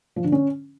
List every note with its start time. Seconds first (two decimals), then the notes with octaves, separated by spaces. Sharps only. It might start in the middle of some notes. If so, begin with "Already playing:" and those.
0.16 F3
0.24 D3
0.32 C#4